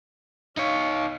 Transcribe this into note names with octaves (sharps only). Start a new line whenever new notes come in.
D#4 C#5 F5